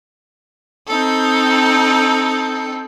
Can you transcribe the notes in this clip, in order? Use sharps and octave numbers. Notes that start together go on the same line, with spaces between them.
C4 D#4 A4